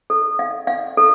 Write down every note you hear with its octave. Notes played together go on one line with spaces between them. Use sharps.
A4
F5
F5
A4